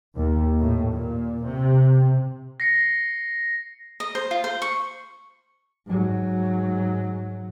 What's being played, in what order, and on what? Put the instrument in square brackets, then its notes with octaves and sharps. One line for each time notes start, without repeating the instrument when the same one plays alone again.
[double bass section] D#2
A2
A#2
C3
[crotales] A#6 C7 C#7
[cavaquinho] D#5
C5
F4
C5
C#6
[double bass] G#2 F#3